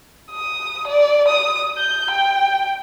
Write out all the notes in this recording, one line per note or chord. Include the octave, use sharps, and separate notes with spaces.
D#6
D5
D#6
G6
G5